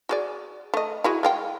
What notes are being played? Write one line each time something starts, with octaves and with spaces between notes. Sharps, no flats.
F#4 G#4 D5
A3 D#5
E4 F#4 G#4
G#3 F5 G5